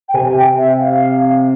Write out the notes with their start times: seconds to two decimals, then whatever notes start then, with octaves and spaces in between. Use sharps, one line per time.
0.09 G5
0.14 C3 G#5
0.36 G5
0.58 E5
0.80 F5